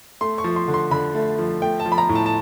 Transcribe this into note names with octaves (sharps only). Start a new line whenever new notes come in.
A3 C6
C#6
F3
C6
D3
C6
D3 B5
A3
F3
A3 G5
A5
F3
B5
A#5
A2
A5
A5